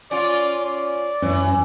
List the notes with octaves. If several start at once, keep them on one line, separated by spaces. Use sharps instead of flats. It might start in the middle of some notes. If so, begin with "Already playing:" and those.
C#4 F4 D5
D5
F#2 E3 C#4